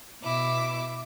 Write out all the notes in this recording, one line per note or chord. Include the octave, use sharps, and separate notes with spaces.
B2 E4 D6